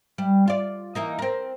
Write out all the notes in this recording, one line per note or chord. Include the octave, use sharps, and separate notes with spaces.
G3
F4 D5
E3 A#3 D#4
C4 A#4